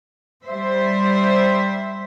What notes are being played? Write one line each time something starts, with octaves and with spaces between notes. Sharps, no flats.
G3 C5 E5